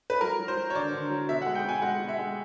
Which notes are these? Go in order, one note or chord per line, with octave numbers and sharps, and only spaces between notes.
B4
F#3 A#4
F#3
C5
F#3
C#5
D3 D5
D3
F#3
B2 E5
F#5
G#3
G5
B2 G#5
G#3 F#5
B2
E5
G#3